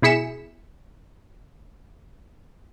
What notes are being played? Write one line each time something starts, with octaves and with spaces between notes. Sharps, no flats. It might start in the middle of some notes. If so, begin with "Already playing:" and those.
B2 E4 G#4 B6 C#7 E7